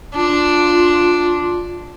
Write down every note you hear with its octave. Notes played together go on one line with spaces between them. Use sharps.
D4 F4